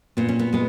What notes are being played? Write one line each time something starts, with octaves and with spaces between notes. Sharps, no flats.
A#2 B3
C#4
B3
G#3 B3